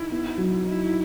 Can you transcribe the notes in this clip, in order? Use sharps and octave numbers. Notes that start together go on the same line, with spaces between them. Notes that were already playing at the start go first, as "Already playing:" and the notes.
Already playing: D#4 E4
B3
F#3
D#4 E4